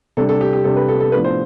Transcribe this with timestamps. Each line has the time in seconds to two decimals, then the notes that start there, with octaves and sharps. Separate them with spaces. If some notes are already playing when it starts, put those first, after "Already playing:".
0.17 C3 G3 D4 A4
0.29 A4
0.41 G4
0.53 G4
0.64 C3 G3 D4 A4
0.76 B4
0.88 A4
1.00 A4
1.12 A2 F3 B3 D4 B4
1.24 C5